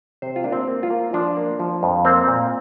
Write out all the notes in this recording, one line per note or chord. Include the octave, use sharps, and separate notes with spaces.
C3 C5
F4
A#3 D4
C4
A#3
F4
A#3
F3 D4
A#3
F3
F2
A#3 C4
A#2